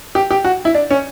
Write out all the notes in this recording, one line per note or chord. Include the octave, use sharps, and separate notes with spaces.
G4
G4
F#4
E4
D4
C#4